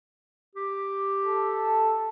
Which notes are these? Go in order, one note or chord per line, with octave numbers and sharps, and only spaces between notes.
G4
A4